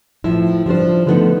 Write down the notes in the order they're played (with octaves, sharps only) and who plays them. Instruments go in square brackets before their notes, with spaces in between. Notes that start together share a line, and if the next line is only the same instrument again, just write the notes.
[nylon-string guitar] A2 F3 E4
F3 G3 D4 C5
D3 F3 G3 A3 B3 D#4